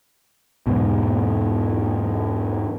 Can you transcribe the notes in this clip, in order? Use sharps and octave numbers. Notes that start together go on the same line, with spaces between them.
E2 G#2 B2